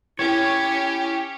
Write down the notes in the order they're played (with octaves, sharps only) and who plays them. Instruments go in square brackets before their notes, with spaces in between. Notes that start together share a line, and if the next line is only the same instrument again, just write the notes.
[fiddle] C#4 G4 [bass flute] E4 [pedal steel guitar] C#5